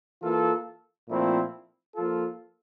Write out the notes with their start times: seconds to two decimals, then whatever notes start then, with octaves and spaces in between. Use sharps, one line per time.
0.22 E3 A#3 F4 A4
1.09 A#2 F3 A3 C4 E4
1.96 F3 A#3 F4 A4